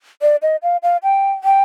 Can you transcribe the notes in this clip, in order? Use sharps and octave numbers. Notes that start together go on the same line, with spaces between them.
D5
D#5
F5
F5
G5
G5